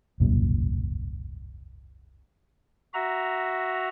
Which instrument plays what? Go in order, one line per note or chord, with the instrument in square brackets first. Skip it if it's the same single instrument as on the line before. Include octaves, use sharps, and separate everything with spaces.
[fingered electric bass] E1 C2 F#2 A#2
[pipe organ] F#4 E5 A#5